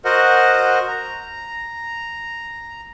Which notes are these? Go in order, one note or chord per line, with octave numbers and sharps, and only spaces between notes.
F#4 A#4 C5 D#5 F#5
A#5